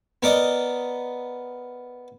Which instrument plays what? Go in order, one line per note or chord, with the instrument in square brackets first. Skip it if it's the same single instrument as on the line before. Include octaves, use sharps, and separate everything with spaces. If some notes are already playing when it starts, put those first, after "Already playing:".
[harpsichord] B3 A#4 D5 D#5